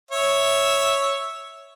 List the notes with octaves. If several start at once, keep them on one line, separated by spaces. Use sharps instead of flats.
C#5 E5